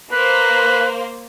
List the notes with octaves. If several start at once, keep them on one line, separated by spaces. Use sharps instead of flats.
A#3 B4 C5